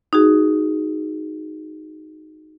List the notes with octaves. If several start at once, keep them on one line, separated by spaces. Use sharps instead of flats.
D#4 F#4 G#4